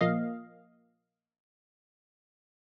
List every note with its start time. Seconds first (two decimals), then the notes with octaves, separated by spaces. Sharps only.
0.01 A#2 F3 A#3 D#5 F5